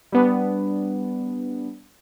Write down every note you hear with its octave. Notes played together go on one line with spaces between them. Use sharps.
G3 B3 D4